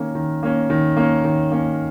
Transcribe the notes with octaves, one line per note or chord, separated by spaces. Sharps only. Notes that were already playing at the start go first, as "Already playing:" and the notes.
Already playing: D#3 A#3 C#4
D#3
A#3 C#4
D#3
A#3 C#4
D#3
A#3 C#4